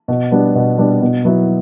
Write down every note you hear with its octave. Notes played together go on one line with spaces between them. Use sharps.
B2
G3 B3 D4
B2
G3 B3 D4
B2
F#3 B3 E4